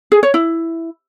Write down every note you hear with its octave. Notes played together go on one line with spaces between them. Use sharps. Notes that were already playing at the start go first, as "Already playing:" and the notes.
G#4
C#5
E4